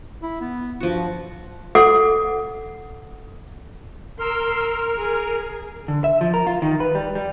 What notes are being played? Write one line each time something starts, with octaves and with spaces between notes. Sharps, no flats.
E4
B3
G2 F3 F#4
A4 F#5 D6
A#4 C6 E6 F6
G#4
D3
E5
F3
A#4
F4
D#3
B4
G3
G3